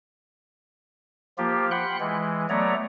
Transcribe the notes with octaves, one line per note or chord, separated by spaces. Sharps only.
F3 A#3 F4 G4
F#5 G5 B5 C6 F#6
E3 G#3
F#3 A3 B3 C#5 D5 A#5